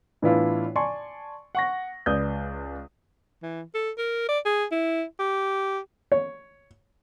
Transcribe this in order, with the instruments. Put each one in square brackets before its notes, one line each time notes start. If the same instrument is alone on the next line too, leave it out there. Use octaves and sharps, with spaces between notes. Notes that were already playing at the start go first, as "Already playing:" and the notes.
[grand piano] A2 E3 B3 D4 E4 F4
D5 G#5 A5 C6 C#6
F#5 C#6 A#6
C#2 B4 D5 D#6 G6
[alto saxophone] E3
A4
A#4
D5
G#4
E4
G4
[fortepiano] C#5